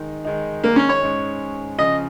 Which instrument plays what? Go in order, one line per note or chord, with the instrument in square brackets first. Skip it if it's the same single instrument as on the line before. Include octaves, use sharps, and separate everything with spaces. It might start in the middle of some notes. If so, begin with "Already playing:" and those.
Already playing: [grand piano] D#3 G#3 D#4
D#3 G#3 D#4
[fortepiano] A#3
C#4
C#5
[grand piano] G#2 G#3 C#4
[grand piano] C#3 F3 C#4 [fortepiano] D#5